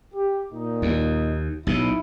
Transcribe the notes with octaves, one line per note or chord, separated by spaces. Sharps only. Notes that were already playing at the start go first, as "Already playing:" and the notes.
G4
A#2 D#4
D#2
B1 B2 D#4 E4